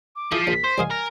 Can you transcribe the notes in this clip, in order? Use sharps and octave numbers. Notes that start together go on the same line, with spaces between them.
D6
F3 E4 G#4
A#1 B6
C5
C2 D#5 F5 G#5
A#4